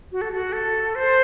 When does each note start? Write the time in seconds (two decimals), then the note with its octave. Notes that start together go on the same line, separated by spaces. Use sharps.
0.12 F#4
0.21 A4
0.33 F#4
0.53 A4
0.95 C5